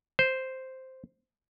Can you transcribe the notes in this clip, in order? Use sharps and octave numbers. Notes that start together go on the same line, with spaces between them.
C5